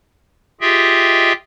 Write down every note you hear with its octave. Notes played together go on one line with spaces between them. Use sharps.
F4 G4 G#4 D#5 E5 G5